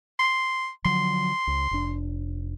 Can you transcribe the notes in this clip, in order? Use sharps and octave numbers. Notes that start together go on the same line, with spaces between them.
C6
D3 F3 F#3 C6
C#2
F1 D4